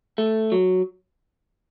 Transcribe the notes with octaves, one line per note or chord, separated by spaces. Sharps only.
A3
F#3